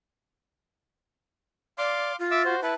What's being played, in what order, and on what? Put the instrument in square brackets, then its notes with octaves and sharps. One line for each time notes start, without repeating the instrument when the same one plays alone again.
[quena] D5 [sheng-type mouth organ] F5 C6 D6
[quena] F4
[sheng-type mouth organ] E5 D6 E6
F#4 C5
[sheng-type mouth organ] E4 B4 [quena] A5